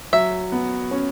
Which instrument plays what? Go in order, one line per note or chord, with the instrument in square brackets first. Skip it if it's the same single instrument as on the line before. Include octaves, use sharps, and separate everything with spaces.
[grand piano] F#3 [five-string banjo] E5
[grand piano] B3
C#4